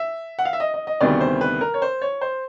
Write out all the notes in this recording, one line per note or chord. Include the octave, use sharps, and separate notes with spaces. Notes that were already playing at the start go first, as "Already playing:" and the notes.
Already playing: E5
F#5
F5
E5
D#5
D#5
D#5
D2 C3 D#3 G3 B3 D5
C5
B4
A#4
C#5
C5
C#5
C5